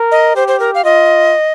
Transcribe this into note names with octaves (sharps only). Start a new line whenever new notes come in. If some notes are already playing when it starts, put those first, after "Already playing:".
Already playing: A#4
D#5
G4 C5
C5
A#4
F5
F4 D#5